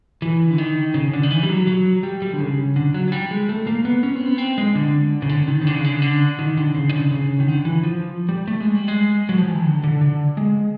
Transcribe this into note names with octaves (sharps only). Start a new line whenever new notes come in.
E3
D3
D#3
C#3
D3
D#3
E3
G3
F#3
F#3
G3
G3
D3
C#3
D3
F#3
F#3
G3
G#3
A3
A#3
B3
C#4
C4
B3
C4
G#3
D3
C#3
D3
D#3
C#3
D3
C#3
D3
C#3
D3
D#3
D3
C#3
D#3
D3
C#3
D#3
D3
E3
F3
G3
A3
G#3
G3
G#3
F#3
F3
E3
D#3
D3
D3
D3
G#3